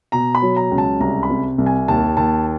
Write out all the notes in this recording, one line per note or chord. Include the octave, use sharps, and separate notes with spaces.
B2 A#5
B5
F#3
A#5
C#2
A5
C2 A#5
B5
C3
C2
G#5
D#2 A5
D#2 A5